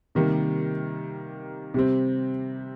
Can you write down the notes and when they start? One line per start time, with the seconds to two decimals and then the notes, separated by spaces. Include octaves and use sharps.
0.15 C3 D#3 G3 A#3
1.74 C3 G3 C4